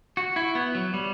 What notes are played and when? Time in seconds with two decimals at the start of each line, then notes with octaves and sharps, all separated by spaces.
0.17 F#4
0.36 E4
0.55 B3
0.75 F#3
0.94 G3